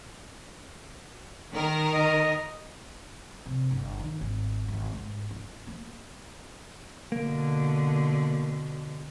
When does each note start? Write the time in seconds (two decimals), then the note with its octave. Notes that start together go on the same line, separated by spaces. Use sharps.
1.54 D#3 A#4
1.93 D#5
3.46 C3
3.71 G1
3.99 D#3
4.21 G#1
4.68 G#1
4.92 G#2
5.31 F4
5.67 A#3
7.12 B2 D3 A#3